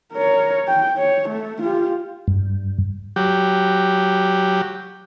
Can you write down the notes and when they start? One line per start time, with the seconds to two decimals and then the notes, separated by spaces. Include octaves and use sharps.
0.13 A#4 C#5
0.68 G5
0.97 C#5
1.29 A3
1.62 F4 G4
2.28 G2
3.16 F#3 G4